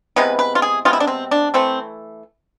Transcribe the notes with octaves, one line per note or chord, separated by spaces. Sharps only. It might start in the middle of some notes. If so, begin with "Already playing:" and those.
C3 E3 G#3 B3 B4
B4
F4
G#4
C3 G#3 B3 F4
E4
D4
C4
D4
E3 A3 C4